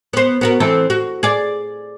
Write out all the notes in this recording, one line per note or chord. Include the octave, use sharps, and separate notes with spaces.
B3 C5
B3 F#4 A#4
E3 C4 A4
F#4
G#4 D5